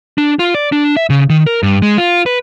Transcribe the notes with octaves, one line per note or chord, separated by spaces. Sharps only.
D4
F4
D5
D4
E5
C#3
D#3
A#4
G2
G#3
F4
B4